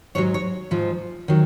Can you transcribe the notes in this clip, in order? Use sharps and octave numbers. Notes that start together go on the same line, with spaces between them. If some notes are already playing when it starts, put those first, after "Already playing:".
G#2 F#3 C#5
C#5
G#2 F3
D#3 F#3